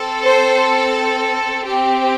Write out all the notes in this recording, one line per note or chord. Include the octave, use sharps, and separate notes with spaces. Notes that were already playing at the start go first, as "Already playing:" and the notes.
Already playing: C4 A4
C5
C4 G4